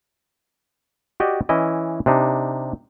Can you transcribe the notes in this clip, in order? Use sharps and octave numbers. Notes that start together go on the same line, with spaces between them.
F#4 G4 D5 D#5
E3 C#4 E4 D#5
C3 D4 D#4